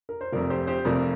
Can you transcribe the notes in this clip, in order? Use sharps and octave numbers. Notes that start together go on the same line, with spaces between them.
A#4
C5
F1 F2 C3 A#4 D5
G4 C5
G4 C5
F1 F2 C3 A#4 D5